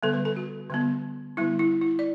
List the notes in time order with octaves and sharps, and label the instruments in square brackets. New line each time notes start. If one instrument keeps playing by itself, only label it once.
[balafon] D3 G3 B3 A4
B4
A4
F#4
D3 G3 B3
D3 G3 B3 E4
E4
E4
D5